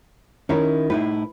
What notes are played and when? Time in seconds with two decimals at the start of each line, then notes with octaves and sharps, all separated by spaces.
0.49 D#3 C#4 E4 C#5 E5
0.90 A2 D#4 E4 B4